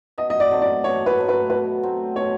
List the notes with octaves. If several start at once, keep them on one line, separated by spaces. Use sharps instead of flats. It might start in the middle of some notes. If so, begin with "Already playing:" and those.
B2 D#5
D#5
D5
F#3 A3 C4
D5
B2 C#5
B4
F#3 A3 C4
B4
B2 B4
F#3 A3 C4
B2 C#5